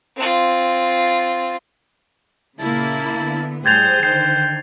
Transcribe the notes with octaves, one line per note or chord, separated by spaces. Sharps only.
C4 F4
A#2 C#3 A#3 E4 A5
D3 B3
A2 G3 G#4 C5 G5 G#6 A6 F7
D3 D#3 G5 C7